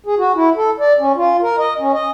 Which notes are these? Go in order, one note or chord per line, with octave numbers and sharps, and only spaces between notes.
G#4
F#4
E4
A4
D5
C#4
F4
A#4
D#5
C#4
D#5